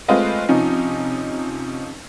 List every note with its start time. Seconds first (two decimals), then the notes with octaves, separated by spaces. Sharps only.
0.08 G#3 A3 C4 F4 B4 D#5
0.49 C3 F3 C#4 D#4